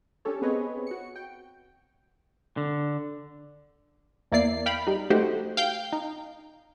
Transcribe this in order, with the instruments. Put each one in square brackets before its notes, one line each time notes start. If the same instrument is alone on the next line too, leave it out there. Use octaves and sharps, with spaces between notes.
[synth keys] C#4 D4 G4 A4 C#5
B3 C4 G#4 B4 C#5 D#5
F#4 C#7
G5
[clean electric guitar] D3
[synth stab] E2 A#3 E4 D5 C7
F5 G5 B5
G3 D#4
A3 D#4 F#4 G4 C5
F5 G5 G6
D#4